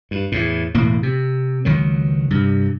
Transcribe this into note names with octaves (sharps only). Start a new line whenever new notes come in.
G2
E2 A2
E1 A2 A#3
C3
C#2 D#3 F#3
G2 C3